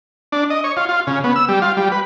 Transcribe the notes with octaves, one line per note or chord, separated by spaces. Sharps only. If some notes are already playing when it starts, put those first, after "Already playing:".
D4
D#5
C#5
F4
F4
C#3
B3
E6
G3
F4
G3
B4